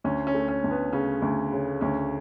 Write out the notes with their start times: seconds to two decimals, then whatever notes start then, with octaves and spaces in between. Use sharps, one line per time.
0.04 D2 C#4
0.27 C#4
0.34 A3
0.49 C#4
0.64 D2
0.71 B3
0.93 C#3 C#4
1.22 D2
1.52 C#3
1.81 D2 C#4